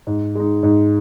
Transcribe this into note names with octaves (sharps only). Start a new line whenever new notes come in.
G#2
G#3 D#4
G#2